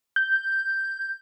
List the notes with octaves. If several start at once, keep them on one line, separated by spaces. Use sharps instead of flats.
G6